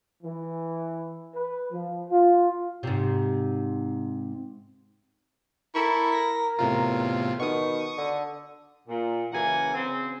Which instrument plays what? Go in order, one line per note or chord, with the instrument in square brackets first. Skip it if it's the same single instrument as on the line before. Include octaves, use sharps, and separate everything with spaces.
[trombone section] E3
B4
F3
F4
[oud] G#2 C3
[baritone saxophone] E4 [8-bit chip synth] A4 C#6 [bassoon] A#4
[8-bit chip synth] A#6 B6
[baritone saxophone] E2 [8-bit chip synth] A2 C3 F4
[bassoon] B2 [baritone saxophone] D#3 [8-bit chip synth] C#6 D#6
[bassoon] D3
[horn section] A#2
F#2 C#3 E3 A#3 F#5 G#5
C#3 C4